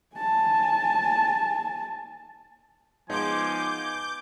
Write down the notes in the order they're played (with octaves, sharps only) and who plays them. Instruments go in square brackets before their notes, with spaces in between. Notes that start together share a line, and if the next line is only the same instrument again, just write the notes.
[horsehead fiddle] G#5 A5
[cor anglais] F3 [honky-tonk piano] G#3 B3 D#4 [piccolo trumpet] G#5 [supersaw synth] D6 G6